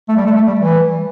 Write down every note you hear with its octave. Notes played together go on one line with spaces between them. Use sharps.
A3
G3
A3
A3
G3
E3